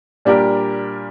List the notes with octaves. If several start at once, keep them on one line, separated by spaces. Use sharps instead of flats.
A#2 G3 D4 G4 A#4